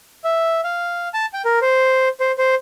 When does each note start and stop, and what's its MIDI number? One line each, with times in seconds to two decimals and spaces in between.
0.24 0.61 76
0.64 1.08 77
1.14 1.26 81
1.33 1.42 79
1.45 1.59 70
1.62 2.09 72
2.20 2.32 72
2.38 2.55 72